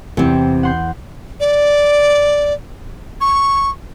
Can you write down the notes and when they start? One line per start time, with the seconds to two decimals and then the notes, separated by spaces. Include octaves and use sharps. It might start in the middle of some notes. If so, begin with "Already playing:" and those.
0.17 E2 C3 C4
0.63 F#5 C6 G6
1.40 D5
3.21 C#6